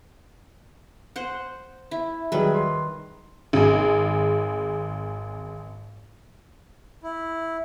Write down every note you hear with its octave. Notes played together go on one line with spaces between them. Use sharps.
C5 F#5
E4
D#3 F#3 G3 G#4 B4
C6
G#1 G#4
E4